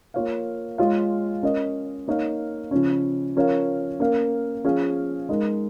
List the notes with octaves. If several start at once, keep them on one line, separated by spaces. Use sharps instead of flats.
A#3 F4 C#5 F5
G#3 F4 C#5 F5
C#4 A#4 D#5
A#3 D#4 C#5 F5
C#3 F3 C#4
F3 C#4 A#4 C#5 F5
A#3 C#4 A#4 F5
F3 C#4 G#4 F5
G#3 D#4 A#4